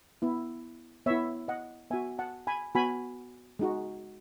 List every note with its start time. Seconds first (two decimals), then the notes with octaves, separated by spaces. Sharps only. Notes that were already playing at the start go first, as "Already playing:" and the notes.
0.22 B3 E4
1.06 B3 E4 C#5 E5
1.48 D#5 F#5
1.90 B3 F#4 E5 G#5
2.19 F#5 A5
2.47 G#5 B5
2.75 B3 F#4 G#5 B5
3.59 G#3 D#4 F#4